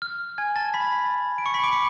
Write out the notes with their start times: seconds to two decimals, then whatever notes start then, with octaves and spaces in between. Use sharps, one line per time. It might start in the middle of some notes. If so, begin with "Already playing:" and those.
0.02 F6
0.38 G#5 G#6
0.56 A5 A6
0.74 B5 B6
1.38 D7
1.46 C#6 C#7
1.54 B5 B6
1.63 D6 D7
1.72 C#6 C#7